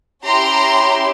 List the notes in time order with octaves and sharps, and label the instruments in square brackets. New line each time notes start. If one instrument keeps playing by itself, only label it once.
[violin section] C#4 E4 G4 A#5 C6